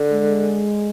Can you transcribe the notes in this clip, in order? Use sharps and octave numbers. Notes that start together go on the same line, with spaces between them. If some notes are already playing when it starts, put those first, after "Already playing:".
Already playing: D3
G#3